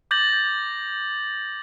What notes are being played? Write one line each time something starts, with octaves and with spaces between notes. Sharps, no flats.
D6 G6 A6 A#6 F#7